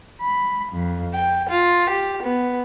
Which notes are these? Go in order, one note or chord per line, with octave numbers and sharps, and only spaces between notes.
B5
F2
G5
F4
G4
B3